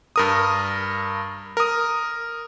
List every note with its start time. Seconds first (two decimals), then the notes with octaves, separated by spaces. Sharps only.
0.16 G2 A#4 D#6
1.57 A#4 D#6